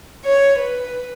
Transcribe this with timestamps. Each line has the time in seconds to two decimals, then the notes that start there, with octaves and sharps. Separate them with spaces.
0.24 C#5
0.59 B4